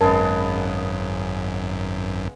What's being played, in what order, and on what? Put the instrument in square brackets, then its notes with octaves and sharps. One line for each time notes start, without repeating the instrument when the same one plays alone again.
[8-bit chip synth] G#1 F#2 [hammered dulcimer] C#3 G#3 B3 [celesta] A#4 A5